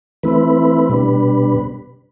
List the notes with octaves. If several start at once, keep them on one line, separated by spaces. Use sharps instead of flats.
E3 A3 C4 E4 B4
B2 G3 D4